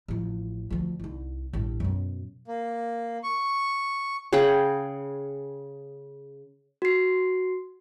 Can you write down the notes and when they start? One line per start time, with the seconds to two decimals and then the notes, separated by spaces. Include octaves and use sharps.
0.08 A1 F3
0.70 D2 F3
1.00 C2 D#4
1.53 A1 G2
1.80 F#2 B2
2.48 A#3
3.24 C#6
4.33 C#3 G#4 F#5 G5
6.82 F#4 C7